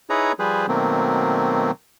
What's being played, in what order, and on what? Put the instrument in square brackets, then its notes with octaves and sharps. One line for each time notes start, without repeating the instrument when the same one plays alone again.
[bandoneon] D#4 E4 G#4 B4 C#5 A#5
F3 G3 G#4 B4 C5
B2 D#3 F#3 A3 A#3 C4